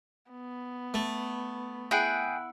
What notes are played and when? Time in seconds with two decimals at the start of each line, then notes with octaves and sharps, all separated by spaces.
0.31 B3
0.94 A3
1.91 E4 G#4 F#5 G5